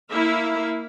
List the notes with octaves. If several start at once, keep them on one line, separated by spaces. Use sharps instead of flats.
A#3 E4 E5 F5